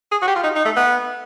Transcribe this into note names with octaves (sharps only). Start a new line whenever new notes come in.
G#4
F#4
G4
F4
D#4
D#4
A3
B3